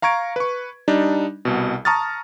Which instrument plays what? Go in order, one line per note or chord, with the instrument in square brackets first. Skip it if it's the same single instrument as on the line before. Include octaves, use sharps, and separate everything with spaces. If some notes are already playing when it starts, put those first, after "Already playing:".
[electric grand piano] F5 A#5 C#6 G#6 D7
B4 C#6
G3 D4 D#4
C2 B2
A5 A#5 C#6 D#6 F6 A6